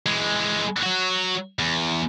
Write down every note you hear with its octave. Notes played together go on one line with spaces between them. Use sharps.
E3 G#3
F#3 F#4
E2